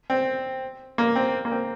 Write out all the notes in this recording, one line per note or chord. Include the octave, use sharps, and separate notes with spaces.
C4
A#3
C4
A#3
C4